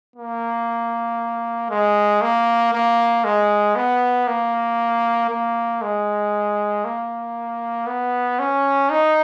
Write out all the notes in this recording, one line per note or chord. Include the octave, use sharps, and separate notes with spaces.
A#3
G#3
A#3
A#3
G#3
B3
A#3
A#3
G#3
A#3
B3
C#4
D#4